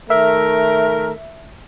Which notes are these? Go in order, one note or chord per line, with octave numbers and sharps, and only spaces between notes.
D#3 A3 A#4 E5